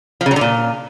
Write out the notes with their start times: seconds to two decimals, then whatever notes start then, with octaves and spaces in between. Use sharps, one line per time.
0.21 F3
0.26 C#3
0.31 F#3
0.36 D3
0.41 A#2